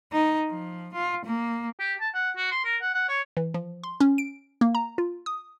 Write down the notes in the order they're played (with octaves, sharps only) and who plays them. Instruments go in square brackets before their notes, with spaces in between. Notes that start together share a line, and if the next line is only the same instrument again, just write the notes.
[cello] D#4
F3
F4
A#3
[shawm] G4
A5
F#5
F#4
C6
A#4
F#5
F#5
C#5
[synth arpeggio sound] E3
F3
C6
C#4
D7
A#3
A#5
F4
D#6